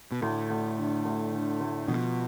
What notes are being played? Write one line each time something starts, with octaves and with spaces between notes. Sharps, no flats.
B2
D2 A2
D2
D3
D2
D3
D2
B2 F3